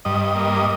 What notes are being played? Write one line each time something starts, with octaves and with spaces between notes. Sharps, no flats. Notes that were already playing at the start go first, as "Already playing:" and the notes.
G2 D#5
D#5
A#3
D#5